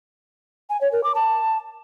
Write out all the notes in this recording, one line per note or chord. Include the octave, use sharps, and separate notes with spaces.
G#5
C#5
A#4
D6
A5